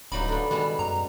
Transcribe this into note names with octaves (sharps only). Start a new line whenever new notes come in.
D1 G2 F#3 D#4 B5
G2 D3
B2 D#3 G3 G#3
F#2 A#5